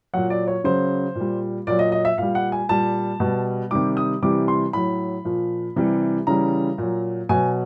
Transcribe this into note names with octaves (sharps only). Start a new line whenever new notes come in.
A#2 F#3 F#5
D5
C#5
C#3 F#3 C5
A#2 G3
A#2 F#3 D5
D#5
D#5
E5
A#2 G3 F5
F#5
G#5
A#2 G3 A5
B2 G3
C3 D#3 G3 D6
D#6
C3 E3 G3 D6
C6
A2 F#3 B5
A#2 F3
C3 E3 G3
C#3 E3 G3 A#5
A#2 F#3
B2 F#3 G#5